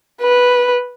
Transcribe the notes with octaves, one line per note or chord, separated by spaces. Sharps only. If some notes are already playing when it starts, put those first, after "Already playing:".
B4